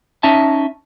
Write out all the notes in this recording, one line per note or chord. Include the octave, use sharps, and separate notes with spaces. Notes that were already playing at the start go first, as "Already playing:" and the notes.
C#4 D#4 E5 A5